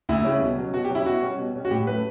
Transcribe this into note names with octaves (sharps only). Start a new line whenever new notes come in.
D2 E4
C#3 G3 C#4
B2
F#3 C#4
B2 F#4
G4
F#3 C#4 E4
B2 F#4
G3 C#4
B2
G3 C#4
F#4
A2 G4
F#3 A3 C#4 B4